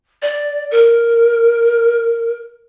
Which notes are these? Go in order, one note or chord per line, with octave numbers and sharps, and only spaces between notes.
D5
A#4